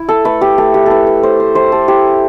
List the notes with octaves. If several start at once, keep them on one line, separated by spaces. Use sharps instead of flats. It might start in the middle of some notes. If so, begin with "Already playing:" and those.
Already playing: E4
A4
A3 B4
G4
A3 A4
G4
E4 A4 B4
B4
A3 C5
C5
E4 C5
A4
E4 G4